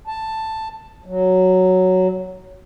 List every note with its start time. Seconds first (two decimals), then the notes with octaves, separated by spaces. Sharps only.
0.07 A5
1.06 F#3